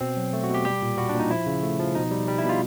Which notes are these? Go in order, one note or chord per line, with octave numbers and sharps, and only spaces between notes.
B2 C4
F#3
A3
F#4
B2
G4
G3 G4
A#2
G3 F#4
D4
A#2
D#4
F3 E4
C#3
A3
F3
B2 D#4
G3
G3
E4
B2
F4